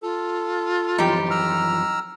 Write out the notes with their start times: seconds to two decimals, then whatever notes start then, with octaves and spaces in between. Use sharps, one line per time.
0.03 F4 A4
0.98 F#2 E3 F3 D#4 G4
1.31 A#5 E6 F6